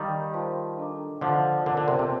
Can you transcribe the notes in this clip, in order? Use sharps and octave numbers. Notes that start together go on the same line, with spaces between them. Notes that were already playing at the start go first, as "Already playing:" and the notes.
Already playing: D#3 G3 A#4 F5 A#5 D6
F4 C5 F5 A5 C6
D4 A4 D#5 A#5 D6
D3 F3 F4 C5 D#5
D3 F4 A#4 D5 A5 C6
D3
C3
C3